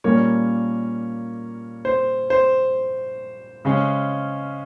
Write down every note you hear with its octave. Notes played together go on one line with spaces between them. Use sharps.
A#2 G3 A#3 C#4 A#4 C#5
C5
C5
C#3 G#3 C#4